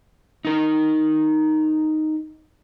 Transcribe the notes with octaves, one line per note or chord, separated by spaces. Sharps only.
D#4 A#4